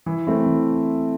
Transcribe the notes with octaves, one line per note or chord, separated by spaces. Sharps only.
E3
A3 C4 E4
E3